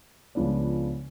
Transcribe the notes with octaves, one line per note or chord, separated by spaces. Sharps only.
C#2 C#3 F3 B3 D4